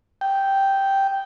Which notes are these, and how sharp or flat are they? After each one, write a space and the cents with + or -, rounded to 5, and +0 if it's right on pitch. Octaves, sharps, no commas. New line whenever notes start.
G5 -5